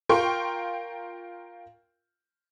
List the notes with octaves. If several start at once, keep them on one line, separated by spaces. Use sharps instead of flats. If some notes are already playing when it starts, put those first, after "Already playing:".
F4 A#4 G5 C6 C#6